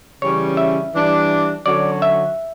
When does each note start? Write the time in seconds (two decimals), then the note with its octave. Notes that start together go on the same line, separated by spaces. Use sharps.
0.21 C#3 E3 G3 C#4 C#5
0.57 E5
0.94 E3 G3 D4
1.66 D3 F#3 C#4 F#4 D5
2.02 E5